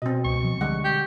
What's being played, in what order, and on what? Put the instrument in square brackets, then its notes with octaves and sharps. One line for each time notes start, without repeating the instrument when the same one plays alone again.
[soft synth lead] B2 [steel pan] C4 D#5
[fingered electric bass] C#2 [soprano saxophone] C#6
[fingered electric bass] F3
[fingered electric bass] D3 [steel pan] G3 G#3 F#5
[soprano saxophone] G4 [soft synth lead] G6